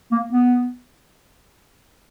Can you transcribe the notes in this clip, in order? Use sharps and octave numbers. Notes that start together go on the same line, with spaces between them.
A#3
B3